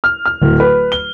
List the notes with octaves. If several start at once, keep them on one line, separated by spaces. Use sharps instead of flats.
F6
F6
D1
B4
G7